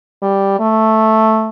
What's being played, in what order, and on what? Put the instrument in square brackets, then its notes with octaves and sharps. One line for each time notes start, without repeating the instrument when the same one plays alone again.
[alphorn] G3
A3